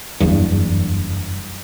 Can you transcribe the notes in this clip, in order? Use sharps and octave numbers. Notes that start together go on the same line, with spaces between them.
F#1 E2 G2